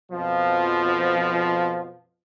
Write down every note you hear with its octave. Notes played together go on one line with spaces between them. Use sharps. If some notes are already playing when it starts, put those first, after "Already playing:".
F2 B2 F3